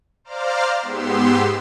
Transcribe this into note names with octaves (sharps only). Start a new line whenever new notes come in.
C5 D5 F5 A#5 D6 F6
G#2 B3 G4 C6 E6